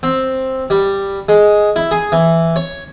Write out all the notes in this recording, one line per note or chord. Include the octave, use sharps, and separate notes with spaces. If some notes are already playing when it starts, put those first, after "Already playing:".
C4
G3
G#3
E4
G#4
E3
C#5